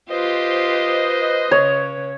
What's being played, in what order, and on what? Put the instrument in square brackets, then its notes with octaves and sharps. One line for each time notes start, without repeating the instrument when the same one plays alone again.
[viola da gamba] F4 G4 [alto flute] B4 [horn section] C5 D#5
[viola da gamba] C#3 [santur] C#5